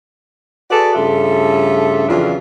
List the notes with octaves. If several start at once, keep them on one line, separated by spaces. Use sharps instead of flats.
F#4 G#4 A4 B4 D5
G2 C#3 A3 F4 A4 E5
F2 C#3 E3 F#3 D4 F4